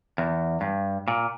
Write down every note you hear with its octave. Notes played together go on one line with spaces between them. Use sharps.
E2
G2
A#2